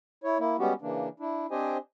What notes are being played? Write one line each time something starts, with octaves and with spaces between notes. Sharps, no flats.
E4 C#5
A#3 E4
G3 G#3 B3 C#4 F#4 G4
C#3 E3 A#3 D4
D4 E4
C4 D4 G4 C5 D#5 G#5